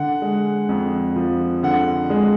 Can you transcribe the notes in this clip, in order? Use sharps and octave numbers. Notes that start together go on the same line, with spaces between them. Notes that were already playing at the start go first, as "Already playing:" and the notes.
Already playing: D3 F#5
G#3
F2
F3
D3 F#5
G#3